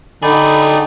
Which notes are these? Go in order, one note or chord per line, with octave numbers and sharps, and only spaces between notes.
D3 D#4 G4 G#4 D5 B5